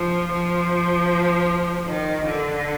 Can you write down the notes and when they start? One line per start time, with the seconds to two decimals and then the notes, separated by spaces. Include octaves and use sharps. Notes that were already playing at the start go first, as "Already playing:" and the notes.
Already playing: F3
0.32 F3
1.87 D#3
2.26 D3